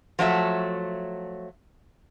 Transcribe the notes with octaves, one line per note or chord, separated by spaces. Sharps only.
F3 F#3 A3 E5